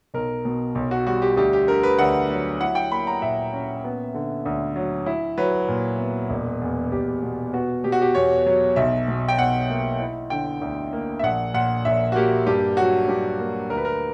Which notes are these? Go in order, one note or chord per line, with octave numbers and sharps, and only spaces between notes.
B1 A#4
B2
B1
F#4
G3 F#4
G4
D2 G4
G4
D3 A#4
B4
D2 F#5
F#3
E4 F#5
G5
A#3 B5
A#5
A#2 E5
C#4
B3
D3
D2
F#3
E4
F#3 B4
A#2
B3
E1
E2
E1 G4
B2
B3 F#4
B2 G4
F#4
G4
E2 C#5
F#3
B1 E5
B2
G5
B1 F#5
A#3
E4
D3 G5
D2
A#3
E5
A#1 F#5
A#2 F#5
A#1 E5
F#4
A#3 G4
G2 G4
F#3 F#4
G2 G4
A#3
D2 A#4
B4
A#4